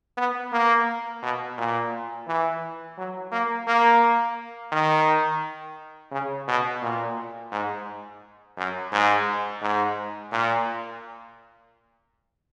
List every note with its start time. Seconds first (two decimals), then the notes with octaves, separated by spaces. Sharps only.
0.18 B3
0.52 A#3
1.23 B2
1.58 A#2
2.28 E3
2.98 F#3
3.32 A#3
3.67 A#3
4.72 D#3
6.12 C#3
6.48 B2
6.82 A#2
7.52 G#2
8.58 F#2
8.92 G#2
9.62 G#2
10.32 A#2